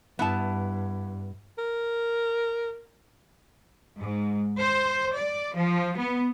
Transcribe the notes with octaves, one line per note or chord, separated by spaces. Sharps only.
G2 B3 E4 A5
A#4
G#2
C5
D5
F3
B3